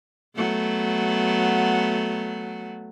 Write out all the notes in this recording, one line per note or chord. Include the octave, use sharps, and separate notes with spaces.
F#3 A3 B3